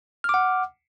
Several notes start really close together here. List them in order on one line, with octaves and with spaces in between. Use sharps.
F6 D6 F#5